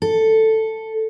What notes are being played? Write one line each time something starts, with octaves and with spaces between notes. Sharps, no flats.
A4